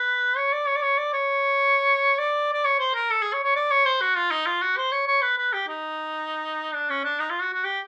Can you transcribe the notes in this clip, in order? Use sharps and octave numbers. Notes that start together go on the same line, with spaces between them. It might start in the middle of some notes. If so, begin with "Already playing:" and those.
Already playing: B4
C#5
D5
C#5
D5
C#5
D5
C#5
D5
D5
C#5
C5
A#4
A4
G#4
C#5
C#5
D5
C#5
C5
F#4
F4
D#4
F4
F#4
C5
C#5
C#5
B4
B4
G4
D#4
D4
C#4
D4
D#4
F4
F#4
F#4
G4